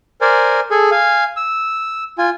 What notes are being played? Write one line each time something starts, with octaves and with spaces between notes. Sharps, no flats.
A#4 C5 D5 G#5
G#4 A4 G#5
F5 G#5
E6
F4 G#5